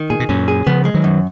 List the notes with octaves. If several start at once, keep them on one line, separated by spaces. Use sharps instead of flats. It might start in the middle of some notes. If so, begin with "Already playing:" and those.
Already playing: D#3
A#2 G#4
B2
F#2 A#2 C#4
G#4
C#3 F3 B3
G#3
D#3 F#3
F#2